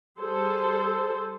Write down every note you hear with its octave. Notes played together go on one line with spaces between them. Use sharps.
G3 G#4 A4 C5